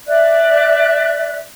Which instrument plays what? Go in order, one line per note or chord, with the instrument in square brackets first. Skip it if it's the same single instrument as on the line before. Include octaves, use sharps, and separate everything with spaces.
[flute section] D5 E5 F#6